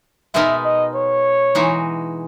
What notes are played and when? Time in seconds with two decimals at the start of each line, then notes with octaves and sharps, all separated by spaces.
0.34 B2 G#3 B3 D#4 A#4 E5
0.65 D#5
0.95 C#5
1.55 E3 G#3 D#4 F#4